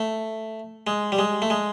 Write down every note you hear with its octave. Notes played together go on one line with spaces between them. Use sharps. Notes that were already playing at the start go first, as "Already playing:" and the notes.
Already playing: A3
G#3
G3
G#3
A3
G#3